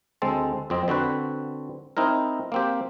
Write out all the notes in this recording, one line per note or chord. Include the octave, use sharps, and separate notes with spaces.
D2 G#3 C4 A4
F2 C4 D#5
D3 C4 F#4 B4
C4 D#4 E4 A#4
A#3 C4 G4